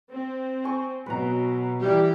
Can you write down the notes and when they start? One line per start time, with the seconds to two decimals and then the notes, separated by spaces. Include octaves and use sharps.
0.10 C4
0.64 G#5 C#6
1.06 B2 F#3 B4 A#5
1.80 E3 G3 E4 G4